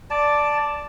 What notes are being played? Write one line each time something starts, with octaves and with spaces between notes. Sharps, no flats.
D5 A5